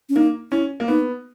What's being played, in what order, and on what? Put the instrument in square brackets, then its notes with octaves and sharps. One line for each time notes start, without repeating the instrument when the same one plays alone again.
[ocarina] C#4
[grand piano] A#3 [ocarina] D#4
[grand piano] C#4 [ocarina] E4
[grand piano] A#3
[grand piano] B3 [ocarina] D#4